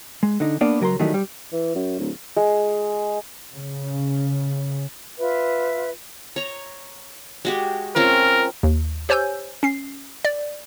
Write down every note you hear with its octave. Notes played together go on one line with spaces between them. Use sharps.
G#3
D3 D#4
A#3 B3 D4 D5
C#2 F#3 A#4 A#5 C6
D#3 E3 F#3 G3 A3 D#4
G3
E3
F#2
D1
G#3
C#3
F4 B4 E5
C#5 A#5
G#3 F#4 G4
C4 C#4 F4 A#4
D#2
G4 C5 C#5 G#5 E6 G6
C#4 C7
D5